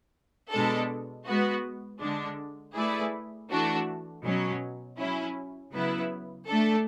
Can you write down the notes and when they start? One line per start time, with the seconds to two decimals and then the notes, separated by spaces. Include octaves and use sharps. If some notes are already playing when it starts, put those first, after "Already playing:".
0.51 B2 G#3 D4 A4
1.26 G#3 B3 F#4
2.00 D3 G#3 D4
2.75 A3 E4 G#4 B4 D5
3.50 E3 A3 D4 F#4
4.24 B2 F#3 C#4
4.98 F#3 C#4 E4
5.73 C#3 F#3 B3 E4 B4
6.47 A3 D4 A4